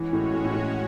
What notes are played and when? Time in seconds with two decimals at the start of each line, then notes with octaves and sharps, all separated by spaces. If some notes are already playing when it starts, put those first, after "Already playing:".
Already playing: E3 G#3 C#4 F#4 C#5
0.13 A2
0.33 A2
0.44 A2
0.55 A2